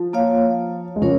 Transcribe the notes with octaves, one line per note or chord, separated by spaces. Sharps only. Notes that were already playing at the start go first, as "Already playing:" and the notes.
Already playing: F3
A#3 F4 C#5 F5
G#3
C#3 F3 C#4 A#4 C#5